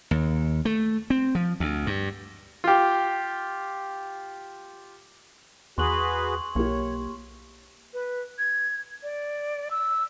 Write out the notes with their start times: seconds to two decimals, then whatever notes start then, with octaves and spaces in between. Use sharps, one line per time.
0.11 D#2
0.65 A3
1.10 C4
1.35 F3
1.60 D2
1.87 G2
2.64 F4 G4
5.78 E2 F#4 G#4 B4 C6 C#6 F#7
6.55 B1 A#3 G4 C#5
7.94 B4
8.39 G#6
9.03 D5
9.71 E6